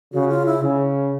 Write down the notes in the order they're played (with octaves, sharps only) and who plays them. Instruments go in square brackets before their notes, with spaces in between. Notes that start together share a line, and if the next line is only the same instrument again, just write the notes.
[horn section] C#3 [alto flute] F#4
[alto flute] F4
E4
[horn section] C#3